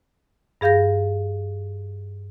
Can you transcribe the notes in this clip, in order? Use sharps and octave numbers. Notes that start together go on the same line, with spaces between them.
G2 G#4 F5 G6 A#6